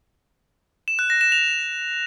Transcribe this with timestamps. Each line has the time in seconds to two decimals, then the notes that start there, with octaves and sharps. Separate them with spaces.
0.88 E7
0.99 F#6
1.10 A#6
1.21 E7
1.32 F7